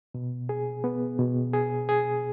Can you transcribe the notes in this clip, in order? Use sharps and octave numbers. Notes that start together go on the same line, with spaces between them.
B2
G#4
B3
B2
G#4
G#4